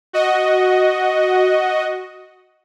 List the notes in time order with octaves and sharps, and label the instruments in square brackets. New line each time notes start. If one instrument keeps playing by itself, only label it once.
[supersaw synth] F#4 D#5